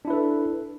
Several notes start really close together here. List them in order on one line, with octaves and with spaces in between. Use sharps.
D4 E4 B4 A4